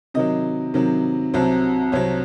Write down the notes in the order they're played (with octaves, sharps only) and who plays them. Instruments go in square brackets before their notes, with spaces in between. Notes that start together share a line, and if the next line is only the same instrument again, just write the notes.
[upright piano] C3 D#3 F#3 D#5
C3 D#3 F#3
C2 C3 F#3 C4
C2 C3 F#3 C4 C#5